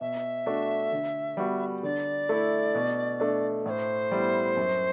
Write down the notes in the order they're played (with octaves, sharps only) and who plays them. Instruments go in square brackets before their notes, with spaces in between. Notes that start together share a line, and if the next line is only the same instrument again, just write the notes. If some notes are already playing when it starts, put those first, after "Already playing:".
[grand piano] B2 [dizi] E5
[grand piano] A3 D4 F#4
D3
G3 B3 F#4
[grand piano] D3 [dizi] D5
[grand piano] A3 E4
B2
A3 D4
[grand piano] A2 [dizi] D5
[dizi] C5
[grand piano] G3 B3 E4
F#2